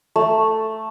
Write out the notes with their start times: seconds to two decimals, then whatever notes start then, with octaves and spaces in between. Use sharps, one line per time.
0.16 A3